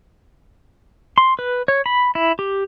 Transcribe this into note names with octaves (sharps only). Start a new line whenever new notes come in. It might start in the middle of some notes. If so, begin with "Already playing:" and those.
C6
B4
C#5
B5
E4
G4